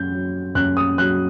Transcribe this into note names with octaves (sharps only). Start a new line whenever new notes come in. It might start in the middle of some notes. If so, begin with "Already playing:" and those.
Already playing: F#2 G6
F#3
F#2 F#6
D#6
F#3 F#6